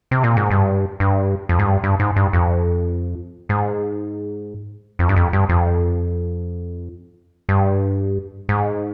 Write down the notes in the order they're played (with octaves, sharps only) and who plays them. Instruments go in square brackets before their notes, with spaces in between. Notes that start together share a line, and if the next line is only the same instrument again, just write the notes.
[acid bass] C3
A#2
G#2
G2
G2
F2
G#2
G2
G2
G#2
G2
F2
G#2
F2
G2
F2
G2
F2
G2
G#2